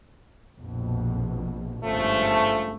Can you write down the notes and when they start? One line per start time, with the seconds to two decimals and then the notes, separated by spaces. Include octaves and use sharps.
0.59 A#1 F2 B2
1.84 G#1 G2 C#3 F3 A3